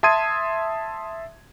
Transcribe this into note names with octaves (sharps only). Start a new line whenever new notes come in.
E5 A5 C6 D#6 G#6 D#7